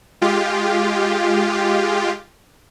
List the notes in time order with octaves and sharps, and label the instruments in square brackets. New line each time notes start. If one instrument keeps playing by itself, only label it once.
[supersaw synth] G#3 F4 G4